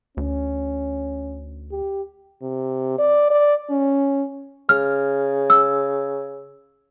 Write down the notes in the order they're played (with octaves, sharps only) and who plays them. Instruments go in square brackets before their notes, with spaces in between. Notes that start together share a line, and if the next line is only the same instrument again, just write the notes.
[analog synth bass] D2 [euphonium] C#4
[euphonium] G4
[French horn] C3
D5
D5
C#4
[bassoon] C#3 [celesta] F6
[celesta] E6